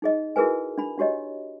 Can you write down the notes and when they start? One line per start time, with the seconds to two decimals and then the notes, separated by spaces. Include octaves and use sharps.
0.02 D#4 G#4 D#5
0.36 E4 F#4 G#4 A#4 B4 G#5
0.78 D4 B5
0.98 D4 F#4 G4 C#5 D#5